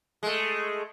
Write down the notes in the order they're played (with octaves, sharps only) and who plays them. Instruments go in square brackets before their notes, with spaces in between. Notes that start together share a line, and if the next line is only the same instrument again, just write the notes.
[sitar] G#3 A3